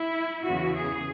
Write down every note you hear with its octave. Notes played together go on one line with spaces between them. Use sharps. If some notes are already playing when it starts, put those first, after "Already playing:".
Already playing: E4
E2 C#3 E3 F#4
G#4